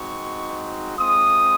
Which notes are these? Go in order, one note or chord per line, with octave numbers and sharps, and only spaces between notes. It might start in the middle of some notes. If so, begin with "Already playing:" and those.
Already playing: G#3 C4 D#4 F#4 C#6
G#3 C4 F4 D#6